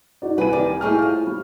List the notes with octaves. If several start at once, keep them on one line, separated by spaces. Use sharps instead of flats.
D#4 F#4 D5
C2 B4 F#5 G#5 D#7
D#3 G3 D5
A2 D#4 G4 G#4 C#6 F6
F4 C5
G3